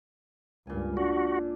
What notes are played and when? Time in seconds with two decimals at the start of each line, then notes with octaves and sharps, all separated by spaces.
0.67 C#2 G2 A#2 G#5
0.97 D4 F#4